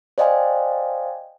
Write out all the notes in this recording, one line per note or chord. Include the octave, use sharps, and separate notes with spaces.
C5 D5 D#5 F5 G5 G#5